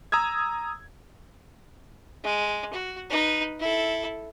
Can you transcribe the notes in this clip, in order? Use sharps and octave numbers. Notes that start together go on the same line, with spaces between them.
A#5 D#6 E6 G#6
G#3
F#4
D#4 B4
E4 A4